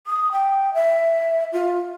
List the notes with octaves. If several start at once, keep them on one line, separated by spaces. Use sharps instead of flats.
D#6
G5
E5
F4